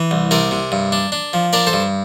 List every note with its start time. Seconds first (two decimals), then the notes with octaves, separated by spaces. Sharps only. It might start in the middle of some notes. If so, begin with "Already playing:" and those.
Already playing: E3
0.11 C2
0.31 C3 A#4 D5
0.51 C3
0.72 G2
0.92 D4
1.12 D4
1.33 F3
1.53 D4 A#4 D5
1.67 A4 C5
1.73 G2